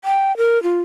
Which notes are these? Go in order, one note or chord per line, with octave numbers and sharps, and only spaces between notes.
G5
A#4
F4